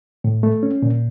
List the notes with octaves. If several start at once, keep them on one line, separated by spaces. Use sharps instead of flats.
A2
A3
C#4
A#2